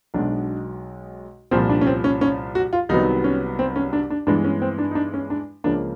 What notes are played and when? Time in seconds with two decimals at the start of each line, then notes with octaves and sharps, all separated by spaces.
0.14 B1 B2 G#3 D4
1.51 C2 A#2 F3 C4
1.69 D4
1.81 C#4
1.87 C4
2.04 C#4
2.21 C#4
2.55 F#4
2.73 F4
2.89 C2 C3 D#3 F#3 B3 D#4
3.24 C#4
3.59 C4
3.76 C#4
3.93 D4
4.10 D4
4.27 G2 E3 G#3 B3 D4
4.44 C#4
4.62 C4
4.78 D4
4.91 D#4
4.95 D4
5.14 C#4
5.30 D4
5.64 C#2 C#3 F3 A#3 D4